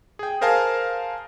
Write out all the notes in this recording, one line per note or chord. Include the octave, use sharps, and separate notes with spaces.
G#4 G5
G#4 A#4 C5 F5 G#5 A5